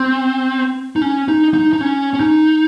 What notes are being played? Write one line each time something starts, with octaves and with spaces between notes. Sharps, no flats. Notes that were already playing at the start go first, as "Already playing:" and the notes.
Already playing: C4
D#4
C#4
D#4
D#4
D#4
C#4
C#4
D#4